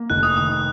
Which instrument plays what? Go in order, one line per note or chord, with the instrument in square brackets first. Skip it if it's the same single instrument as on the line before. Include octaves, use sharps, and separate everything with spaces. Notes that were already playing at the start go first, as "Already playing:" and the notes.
Already playing: [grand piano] A#3
[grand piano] F1 [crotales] F#6
[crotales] D#6
[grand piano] D#3 [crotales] D#6
[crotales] D#6